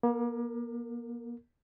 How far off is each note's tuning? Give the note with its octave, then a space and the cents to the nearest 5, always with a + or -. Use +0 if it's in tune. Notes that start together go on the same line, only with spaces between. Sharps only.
A#3 +40 A#4 -20